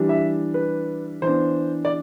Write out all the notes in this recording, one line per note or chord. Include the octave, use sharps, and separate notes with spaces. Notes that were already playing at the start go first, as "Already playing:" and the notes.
Already playing: E3 G3 D4
E5
B4
E3 B3 D4 C5
D5